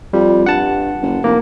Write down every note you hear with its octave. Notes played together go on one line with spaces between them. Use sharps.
F2 G3
G2 F#5 A5
F#1
F1 A#3